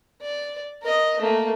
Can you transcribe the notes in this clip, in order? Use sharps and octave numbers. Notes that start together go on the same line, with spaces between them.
D5
A#4 D#5
A3 A#3